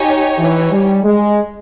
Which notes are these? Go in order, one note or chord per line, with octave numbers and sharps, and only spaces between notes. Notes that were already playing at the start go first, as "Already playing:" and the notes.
Already playing: D#4 G4 C#5 G#5
E3
G3
G#3